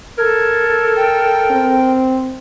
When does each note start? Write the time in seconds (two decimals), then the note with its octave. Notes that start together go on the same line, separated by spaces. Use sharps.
0.18 A4 A#4 G#6
0.96 G5
1.51 C4